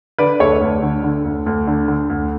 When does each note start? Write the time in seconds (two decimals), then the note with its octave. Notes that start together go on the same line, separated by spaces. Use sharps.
0.18 D3 B4 D5
0.40 D2 A4 C#5
0.61 D2
0.82 D3
1.04 D3
1.25 D2
1.46 D2
1.67 D3
1.88 D3
2.09 D2